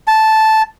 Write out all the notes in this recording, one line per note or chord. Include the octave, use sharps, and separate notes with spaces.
A5